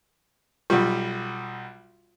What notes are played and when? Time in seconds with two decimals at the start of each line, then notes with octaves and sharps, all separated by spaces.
0.70 B1 G3 F4